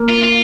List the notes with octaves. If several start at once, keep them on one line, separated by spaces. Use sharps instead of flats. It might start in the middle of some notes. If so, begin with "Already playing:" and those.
Already playing: A#3
F4
F4